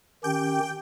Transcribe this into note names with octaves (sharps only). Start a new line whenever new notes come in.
D#3 C#4 G4 G5